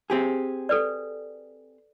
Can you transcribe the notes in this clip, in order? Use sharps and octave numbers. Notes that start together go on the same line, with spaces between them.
C4 G4 G#4
A4 B4 D5